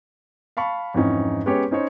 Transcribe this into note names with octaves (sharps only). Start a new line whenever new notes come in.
F5 A5 B5 C#6
F2 G#2 E3 C#4 D#4
G#3 B3 C#4 G4 C#5
C#4 D#4 C5 C#5